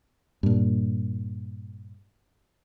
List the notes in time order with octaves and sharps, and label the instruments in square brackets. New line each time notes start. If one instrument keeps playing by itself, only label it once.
[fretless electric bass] G2 A#2